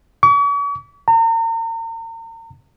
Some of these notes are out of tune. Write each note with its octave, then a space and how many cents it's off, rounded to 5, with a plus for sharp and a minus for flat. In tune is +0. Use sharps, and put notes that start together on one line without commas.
C#6 +45
A#5 -40